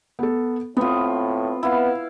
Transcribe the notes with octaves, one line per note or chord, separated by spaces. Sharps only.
B3 A4
A2 B3 C4 F4
B3 E4 F5